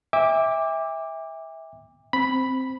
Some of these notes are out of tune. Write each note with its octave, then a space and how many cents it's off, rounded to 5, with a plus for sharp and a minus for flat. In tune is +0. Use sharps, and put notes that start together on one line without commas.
E5 -20 G5 +45 D6 +0
C4 +0 B5 +0